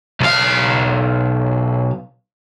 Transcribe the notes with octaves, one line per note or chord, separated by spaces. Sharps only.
B1 F5